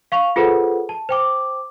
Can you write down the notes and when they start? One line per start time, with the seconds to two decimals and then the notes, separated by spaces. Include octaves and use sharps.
0.12 F5 C#6 F7
0.36 F4 G#4 A4 B4 C5 F#5
0.89 A5
1.09 C5 G5 D6